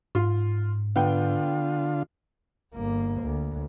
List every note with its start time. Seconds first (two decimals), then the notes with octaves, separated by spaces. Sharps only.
0.15 G#2 F4
0.96 D3 B3 F4 G5
2.74 G1 A#3
3.21 D2